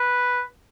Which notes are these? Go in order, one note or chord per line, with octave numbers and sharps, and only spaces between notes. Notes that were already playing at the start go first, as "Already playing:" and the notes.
Already playing: B4